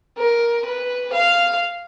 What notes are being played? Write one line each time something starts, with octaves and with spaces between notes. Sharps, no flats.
A#4
B4
F5